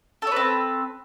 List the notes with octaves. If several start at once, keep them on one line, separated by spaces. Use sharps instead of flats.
C4 A4 B4 C#5